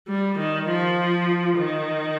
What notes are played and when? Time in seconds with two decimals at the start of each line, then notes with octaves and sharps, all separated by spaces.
0.08 G3
0.38 D#3
0.69 F3
1.58 D#3